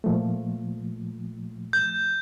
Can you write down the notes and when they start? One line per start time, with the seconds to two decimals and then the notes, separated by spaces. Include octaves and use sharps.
0.04 A#2 F3 A3
1.73 G6